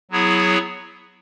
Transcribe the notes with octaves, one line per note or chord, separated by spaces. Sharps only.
F#3 B3 E4 G#4 C#5